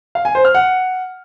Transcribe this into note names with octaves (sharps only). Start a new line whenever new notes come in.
F5
G#5
C5
F6
F#5